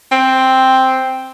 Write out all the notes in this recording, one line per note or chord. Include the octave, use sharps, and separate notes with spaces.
C4